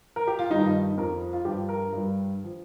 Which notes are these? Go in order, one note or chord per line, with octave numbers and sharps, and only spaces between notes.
A#4
G4
F4
G2 D#3 G3 D#4
F2 F3 A#4
F4
G2 F3 G4
A#4
G2 G3
F3